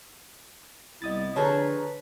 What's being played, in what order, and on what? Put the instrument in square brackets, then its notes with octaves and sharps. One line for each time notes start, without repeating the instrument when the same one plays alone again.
[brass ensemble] C2 [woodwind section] C3 B3 E4 [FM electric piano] D#5 D#6 A6
[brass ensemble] D3 A#5 [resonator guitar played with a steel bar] F3 G#4 A4 [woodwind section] B4 [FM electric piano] C#5